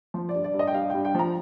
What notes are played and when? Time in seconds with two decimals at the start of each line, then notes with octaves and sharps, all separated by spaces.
0.14 F3 C5
0.29 D5
0.34 G2
0.44 D5
0.54 G2
0.59 D#5
0.67 G5
0.74 G2 F5
0.90 G2 G5
1.05 G5
1.15 F3 A#5